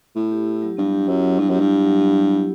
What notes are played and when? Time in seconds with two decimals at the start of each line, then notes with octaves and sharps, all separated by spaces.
0.15 A2 B3
0.31 G4
0.47 E4
0.62 F#3
0.77 G2 B3
0.93 G4
1.08 F#2 E4
1.23 F#3
1.39 G2 B3
1.50 F#2 G4
1.60 G2
1.70 E4
1.85 F#3
2.01 B3
2.17 G4
2.32 E4